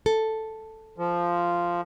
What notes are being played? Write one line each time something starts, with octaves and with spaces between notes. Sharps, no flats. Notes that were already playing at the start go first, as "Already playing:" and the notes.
A4
F3